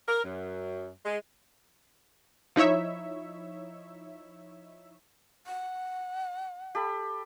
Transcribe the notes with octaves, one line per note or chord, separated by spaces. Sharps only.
A#4
F#2
G#3
F3 D#4 E4 C#5 E5
F#5
G4 A4 B5